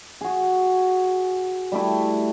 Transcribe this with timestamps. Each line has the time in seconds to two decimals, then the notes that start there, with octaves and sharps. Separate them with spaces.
0.21 F#4 G#4
1.72 G3 A3 E4